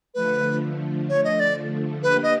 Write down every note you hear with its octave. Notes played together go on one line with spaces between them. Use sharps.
D3 F3 A3 B4
C#5
D#5
D5
A#3 D4 G4 B4
D#5